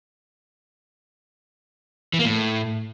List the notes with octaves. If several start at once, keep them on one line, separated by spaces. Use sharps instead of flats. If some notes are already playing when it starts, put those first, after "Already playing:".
E3
A#3
A2